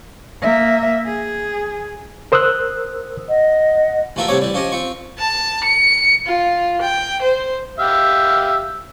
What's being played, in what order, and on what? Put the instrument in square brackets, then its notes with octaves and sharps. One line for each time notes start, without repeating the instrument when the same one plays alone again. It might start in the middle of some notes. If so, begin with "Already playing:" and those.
[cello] A#3 E5
G#4
[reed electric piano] A#4 C5 D#6 E6 F#6
[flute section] D#5 F#5
[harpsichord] A1 G#2 A3 F4 A#4 E5
C2 A2 G3 C4 C#5 D6
E3 G3
F3 C#4 G4 D#5
C4 F4 C#6
[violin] A5
C#7
F4
G5
C5
[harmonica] G4 E5 F5